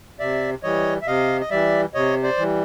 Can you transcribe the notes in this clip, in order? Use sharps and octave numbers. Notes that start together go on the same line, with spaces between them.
C3 D5 E5
E3 G3 C#5 D#5
E5
C3 D#5 F5
D#5
E3 G3 D5 E5
C3 C#5 D#5
C5 D5
E3 G3